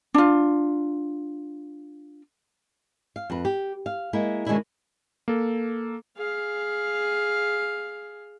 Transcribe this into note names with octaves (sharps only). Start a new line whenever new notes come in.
D4 F4
F5
F2 B4
G4
F5
G#3 A#3 E4
B2 D#3 G#3 C#4 D4 E4
A#3 A4
G#4 F5